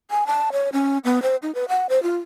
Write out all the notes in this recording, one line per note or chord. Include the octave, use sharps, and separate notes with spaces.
G#5
A5
C#5
C#4
B3
C5
D#4
B4
F#5
C5
F4